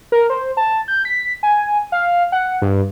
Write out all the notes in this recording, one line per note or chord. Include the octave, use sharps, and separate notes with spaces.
A#4
C5
A5
G6
B6
G#5
F5
F#5
G2